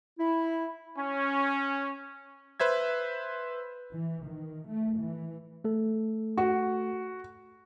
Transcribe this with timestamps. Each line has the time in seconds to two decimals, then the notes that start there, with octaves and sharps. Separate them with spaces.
0.19 E4
0.98 C#4
2.60 B4 C5 E5 G#6
3.92 E3
4.25 D#3
4.68 A3
4.99 E3
5.64 A3 A4
6.37 F#4